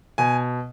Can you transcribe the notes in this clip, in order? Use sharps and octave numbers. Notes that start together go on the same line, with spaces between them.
B2 G#5